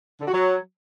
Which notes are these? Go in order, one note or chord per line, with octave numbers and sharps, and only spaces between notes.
D3
F#4
F#3